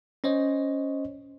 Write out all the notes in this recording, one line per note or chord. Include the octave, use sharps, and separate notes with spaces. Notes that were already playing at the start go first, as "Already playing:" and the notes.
C#4 C5 C#5 D#5